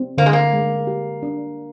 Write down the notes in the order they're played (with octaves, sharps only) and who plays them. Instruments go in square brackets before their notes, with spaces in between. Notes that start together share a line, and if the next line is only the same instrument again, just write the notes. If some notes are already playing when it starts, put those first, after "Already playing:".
Already playing: [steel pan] C4
[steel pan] D3 [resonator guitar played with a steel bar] A#3
[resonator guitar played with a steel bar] G#3
A#3
[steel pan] G#3
G4
D4